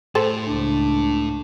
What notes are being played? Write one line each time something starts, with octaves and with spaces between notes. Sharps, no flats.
A2 A4 C5
C#2 D4